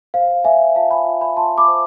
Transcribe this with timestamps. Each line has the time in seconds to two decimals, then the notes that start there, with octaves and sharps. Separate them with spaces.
0.14 C5 F5
0.44 A4 E5 G#5
0.75 F4 F5 A5
0.91 G#5 B5
1.06 F4
1.21 G#5 B5
1.37 F4 A5 C6
1.58 B5 D6
1.68 C5